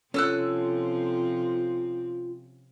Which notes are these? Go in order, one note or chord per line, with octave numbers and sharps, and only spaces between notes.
C3 F3 C4 C#4 F4 A4 E6 F#6